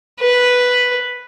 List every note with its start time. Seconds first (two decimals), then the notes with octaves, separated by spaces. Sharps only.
0.20 B4